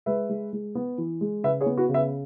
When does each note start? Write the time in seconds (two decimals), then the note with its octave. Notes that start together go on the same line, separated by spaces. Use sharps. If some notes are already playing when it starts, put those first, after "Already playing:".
0.06 G#3 B4 E5
0.29 G#3
0.53 G#3
0.75 B3
0.98 E3
1.21 G#3
1.43 C#3 B4 E5
1.61 G#4 C#5
1.66 B3
1.77 F#4 B4
1.89 C#3
1.94 B4 E5